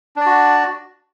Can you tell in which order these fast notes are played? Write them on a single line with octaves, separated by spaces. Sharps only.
D4 D5 F#4